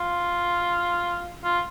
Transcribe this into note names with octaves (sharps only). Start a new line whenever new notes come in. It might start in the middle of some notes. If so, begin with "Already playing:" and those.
Already playing: F4
F4